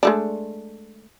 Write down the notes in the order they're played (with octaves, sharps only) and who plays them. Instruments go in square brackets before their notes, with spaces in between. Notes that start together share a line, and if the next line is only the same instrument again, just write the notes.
[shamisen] G#3 A3 D4